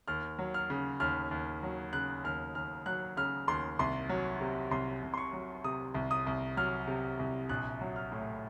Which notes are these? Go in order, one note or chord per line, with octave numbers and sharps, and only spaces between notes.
D#2 F6
F#3
F6
C#3
D#2 F6
D#2
F#3
C#3 F#6
D#2 F6
D#2 F6
F#3 F#6
C#3 F6
D#2 C6
C2 C6
F#3
C3
C2 C6
C2
C6
C#6
F#3
C3 D#6
C2
D#6
C2
F#3 F6
C3
C2
A#1 F#6
F#3
F6
A2